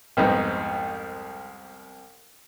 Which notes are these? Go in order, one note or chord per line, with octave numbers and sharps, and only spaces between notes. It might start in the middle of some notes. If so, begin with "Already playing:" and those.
C2 F2 G#2 B3